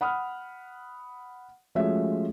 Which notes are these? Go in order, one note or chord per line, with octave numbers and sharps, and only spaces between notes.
F#5 B5 D#6 F6
F3 G#3 A3 C#4 F#4 E5